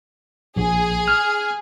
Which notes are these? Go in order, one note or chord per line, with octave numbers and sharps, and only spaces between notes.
A#1 G#4
F6